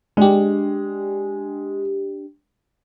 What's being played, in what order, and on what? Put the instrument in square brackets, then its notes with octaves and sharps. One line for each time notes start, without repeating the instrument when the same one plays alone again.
[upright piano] G#3 [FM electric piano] D4 G4